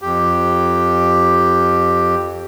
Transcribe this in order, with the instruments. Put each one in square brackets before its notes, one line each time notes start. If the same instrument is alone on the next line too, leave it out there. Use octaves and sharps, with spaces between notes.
[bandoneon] F2 G4